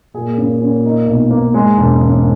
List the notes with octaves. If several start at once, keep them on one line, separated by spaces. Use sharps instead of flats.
A#2 G#4
C#3
C#4
D#4
B1
A#3
G#2 G#3
E1
C#3